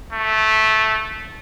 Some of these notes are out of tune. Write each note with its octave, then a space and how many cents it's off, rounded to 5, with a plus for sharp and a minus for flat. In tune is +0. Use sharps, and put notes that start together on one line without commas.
A3 -10